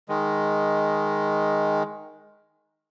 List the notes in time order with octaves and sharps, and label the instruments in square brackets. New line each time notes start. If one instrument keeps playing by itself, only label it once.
[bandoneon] D#3 G#3